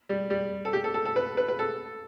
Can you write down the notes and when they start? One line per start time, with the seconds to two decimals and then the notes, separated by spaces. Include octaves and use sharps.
0.09 G3
0.30 G3
0.65 A4
0.73 G4
0.84 A4
0.94 A4
1.05 A4
1.16 B4
1.37 B4
1.48 B4
1.59 A4